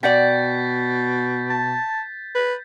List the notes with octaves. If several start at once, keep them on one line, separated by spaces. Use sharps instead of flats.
B2 D5 F#5 G5 G6 A6 B6
A5
B4